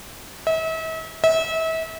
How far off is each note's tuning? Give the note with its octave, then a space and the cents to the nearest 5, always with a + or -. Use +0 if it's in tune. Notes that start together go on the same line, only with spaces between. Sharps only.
E5 -40
E5 -35